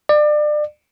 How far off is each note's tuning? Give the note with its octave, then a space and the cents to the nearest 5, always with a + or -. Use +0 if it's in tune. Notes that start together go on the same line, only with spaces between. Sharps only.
D5 +30